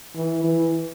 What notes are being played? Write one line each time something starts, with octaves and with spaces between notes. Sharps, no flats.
E3
E3